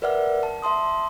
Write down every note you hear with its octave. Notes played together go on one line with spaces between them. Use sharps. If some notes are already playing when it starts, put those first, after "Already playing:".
A#4 B4 D5 E5 F#5 F6
A5
E5 A5 C6 D#6